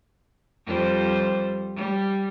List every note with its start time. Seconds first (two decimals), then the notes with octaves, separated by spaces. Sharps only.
0.66 F2 G3 C5
1.76 G3